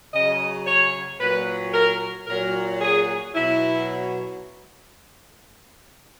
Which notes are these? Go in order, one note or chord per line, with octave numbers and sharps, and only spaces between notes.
C#3 F#3 D#5
C#5
A#2 F#3 B4
A#4
A#2 F#3 A#4
G#4
B2 F#3 E4